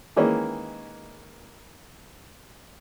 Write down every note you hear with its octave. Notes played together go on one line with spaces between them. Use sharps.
D#3 E3 G#3 A#3 C#4